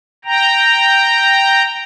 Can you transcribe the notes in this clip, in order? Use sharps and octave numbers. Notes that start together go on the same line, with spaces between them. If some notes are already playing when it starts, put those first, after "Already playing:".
G5 A#5